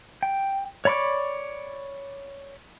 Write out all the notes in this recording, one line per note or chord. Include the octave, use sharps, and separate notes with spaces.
G5
C#5 D5 B5 C#6 D6